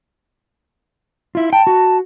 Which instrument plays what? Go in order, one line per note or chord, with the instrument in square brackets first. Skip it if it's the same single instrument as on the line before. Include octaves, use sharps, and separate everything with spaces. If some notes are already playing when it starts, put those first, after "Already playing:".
[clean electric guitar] E4 F4
[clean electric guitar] G5 [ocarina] A5
[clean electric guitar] F#4